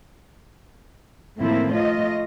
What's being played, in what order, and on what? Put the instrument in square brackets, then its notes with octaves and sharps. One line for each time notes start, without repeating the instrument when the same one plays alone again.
[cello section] A2 D#3 F3 A#3 C4 E4
A3 F4 D#5